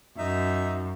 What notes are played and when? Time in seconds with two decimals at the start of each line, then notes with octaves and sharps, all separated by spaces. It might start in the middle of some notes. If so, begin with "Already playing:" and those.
0.18 F#2 D#4 E5